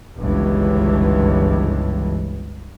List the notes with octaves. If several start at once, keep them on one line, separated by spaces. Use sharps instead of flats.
G1 C#2 G2 E3